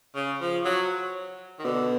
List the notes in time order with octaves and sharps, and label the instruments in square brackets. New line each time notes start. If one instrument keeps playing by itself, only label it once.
[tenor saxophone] C#3
F3
F#3
D#3
[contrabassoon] B2 [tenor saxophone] D3